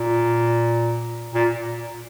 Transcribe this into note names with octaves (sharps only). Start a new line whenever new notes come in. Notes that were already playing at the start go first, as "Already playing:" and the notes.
Already playing: A#2
A#2